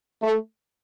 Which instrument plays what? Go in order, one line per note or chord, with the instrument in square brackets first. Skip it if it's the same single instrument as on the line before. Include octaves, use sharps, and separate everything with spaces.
[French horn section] A3